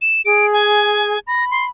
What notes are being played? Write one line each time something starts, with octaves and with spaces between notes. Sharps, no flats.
E7
G#4 D7
G#5
B5 A#6
C6